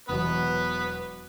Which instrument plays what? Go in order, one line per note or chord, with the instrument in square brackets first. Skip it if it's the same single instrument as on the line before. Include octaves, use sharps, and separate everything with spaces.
[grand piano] E1 E2 B2 F#3 [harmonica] B3 B4